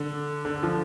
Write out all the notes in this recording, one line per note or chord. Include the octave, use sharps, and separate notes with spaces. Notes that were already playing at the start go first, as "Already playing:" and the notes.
Already playing: D3
D3
F3